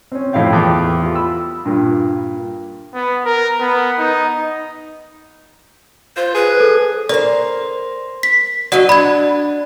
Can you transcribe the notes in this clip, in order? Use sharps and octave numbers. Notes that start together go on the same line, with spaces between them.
C4 C#4
F2 A2 D#4 F5 G5
E2 A4 G5 D6
F4 G4
B5 E6
G2 A#2
B3
A#4
B3
D#4
F4 C5
G#4 B4
A4
A#4 C5 D5
B6
F#3 D5 D#5 F#5
D4 B5 G#6